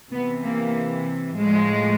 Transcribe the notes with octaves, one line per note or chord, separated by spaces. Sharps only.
C3 E3 B3
A#3
A2 F3 G#3